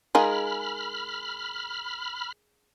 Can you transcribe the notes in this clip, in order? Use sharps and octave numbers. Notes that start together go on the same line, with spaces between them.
G#3 D#4 F4 G#4 A#4 B5 F6